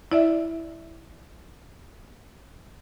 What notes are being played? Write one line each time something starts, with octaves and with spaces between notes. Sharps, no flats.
E4 D5 E5